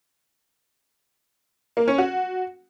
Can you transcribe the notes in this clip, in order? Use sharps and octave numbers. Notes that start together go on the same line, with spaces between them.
A#3
C#4
F#4